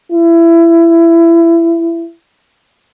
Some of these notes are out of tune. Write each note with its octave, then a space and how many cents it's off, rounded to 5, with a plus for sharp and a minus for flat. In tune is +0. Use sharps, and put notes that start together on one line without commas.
E4 +25